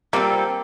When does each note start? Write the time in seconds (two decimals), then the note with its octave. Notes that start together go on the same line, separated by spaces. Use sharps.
0.13 G3 A#3 C4 F4 A4